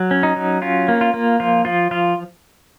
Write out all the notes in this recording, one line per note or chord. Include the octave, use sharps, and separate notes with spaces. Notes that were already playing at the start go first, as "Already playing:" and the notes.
Already playing: F#3
C#4
D#4
F#3
C#4 F4
A#3
F4
A#3
F3 F4
F3 F4
F3 F4